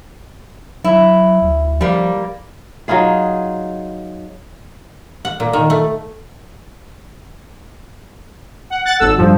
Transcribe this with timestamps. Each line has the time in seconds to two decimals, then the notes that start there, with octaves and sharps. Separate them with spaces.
0.84 F#3 E4
1.42 D2
1.81 F3 G3 A#3
2.88 F#3 D#4 F4 G#4
5.25 F#5
5.40 A#2
5.53 D#3
5.70 A3
8.70 F#5
8.85 F#5 F#6 A6
8.99 G#1 A4 E6
9.18 G2 F3